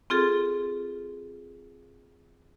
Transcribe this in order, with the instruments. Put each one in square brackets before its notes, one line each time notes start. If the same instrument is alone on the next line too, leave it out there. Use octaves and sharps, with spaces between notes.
[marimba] C4 F4 G#4 A4